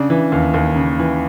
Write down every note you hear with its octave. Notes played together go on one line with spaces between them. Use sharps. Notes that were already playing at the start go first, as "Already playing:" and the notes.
Already playing: C#3 D4
E3
D#2
D#2
C#3
E3